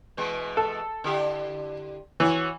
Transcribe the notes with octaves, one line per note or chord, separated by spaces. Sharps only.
B2 E3 G#3
A4
D3 E4 G4
E3 F#4 C#5